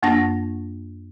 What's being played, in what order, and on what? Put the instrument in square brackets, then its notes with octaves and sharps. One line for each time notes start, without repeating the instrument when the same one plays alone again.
[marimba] F#2 A#3 D4 F#5 A5 A#6